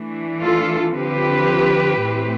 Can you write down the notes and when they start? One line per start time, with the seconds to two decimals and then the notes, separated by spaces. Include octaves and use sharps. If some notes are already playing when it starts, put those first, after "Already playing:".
Already playing: E3 A3 D4
0.41 F4 A4
0.94 D3 F3 C4 G4 B4
2.02 A2 E3 A3 C4